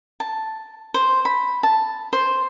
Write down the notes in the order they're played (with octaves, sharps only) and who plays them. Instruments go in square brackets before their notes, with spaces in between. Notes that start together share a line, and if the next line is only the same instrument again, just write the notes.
[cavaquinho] A5
C5
B5
A5
C5